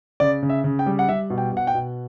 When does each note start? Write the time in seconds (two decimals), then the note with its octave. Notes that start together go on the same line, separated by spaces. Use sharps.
0.20 C#3 D5
0.42 C#3
0.50 E5
0.64 C#3
0.79 G5
0.86 G3
0.99 F#5
1.09 G3 E5
1.30 B2
1.38 G5
1.52 B2 F#5
1.67 G5
1.74 B2